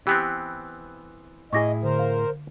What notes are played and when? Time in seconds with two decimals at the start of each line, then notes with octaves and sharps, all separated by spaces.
0.07 E3 B3 C4 G4
1.53 A2 E4 G#4 D#5 C#6 D6 A#6
1.83 D3 A#4 C5
1.99 F5